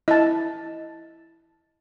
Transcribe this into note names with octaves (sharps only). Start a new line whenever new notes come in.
E4 D#5 A5